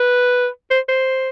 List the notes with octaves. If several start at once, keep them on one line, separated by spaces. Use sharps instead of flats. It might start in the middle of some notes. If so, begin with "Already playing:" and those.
Already playing: B4
C5
C5